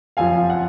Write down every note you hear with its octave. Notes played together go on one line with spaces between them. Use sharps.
F#1 F2 F3 F5 G#5
F#5